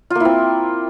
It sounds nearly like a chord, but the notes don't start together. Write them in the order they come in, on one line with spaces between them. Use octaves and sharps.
F4 A#3 E4 C4